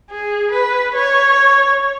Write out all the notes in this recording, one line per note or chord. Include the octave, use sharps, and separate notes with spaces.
G#4
B4
C#5